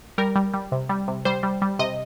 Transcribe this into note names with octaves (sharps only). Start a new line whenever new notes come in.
G3 A#4
G3
G3
C3
G3
C3
G3 C5
G3
G3
C3 D#5